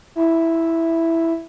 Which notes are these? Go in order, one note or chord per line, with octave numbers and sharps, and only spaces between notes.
E4